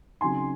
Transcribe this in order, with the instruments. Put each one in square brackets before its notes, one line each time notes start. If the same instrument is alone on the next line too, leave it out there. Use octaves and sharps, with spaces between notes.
[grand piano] C#3 F#3 C4 D#4 G#5 C6